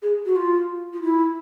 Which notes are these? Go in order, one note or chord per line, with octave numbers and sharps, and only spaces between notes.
G#4
F#4
F4
F4
E4